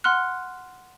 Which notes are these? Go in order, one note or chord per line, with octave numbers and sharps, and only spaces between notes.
F#5 C6 F6 F#6